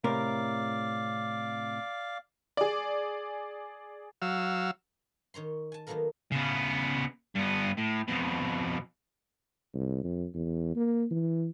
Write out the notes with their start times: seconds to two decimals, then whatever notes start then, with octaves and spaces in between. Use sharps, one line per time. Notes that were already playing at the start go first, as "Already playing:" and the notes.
0.04 A2 C3 A#4 D5 F5 D6
2.57 G#4 D5
4.22 F#3 F5 E6
5.34 D#3 C#5 A#5 C6
5.72 G#5 A5
5.87 D#3 F#3 A#3 B3 A4 A#4
6.32 C#3 B3
7.35 G2 B3
7.77 A2
8.08 F2 B2
9.74 C2
10.04 F2
10.35 E2
10.76 A#3
11.11 E3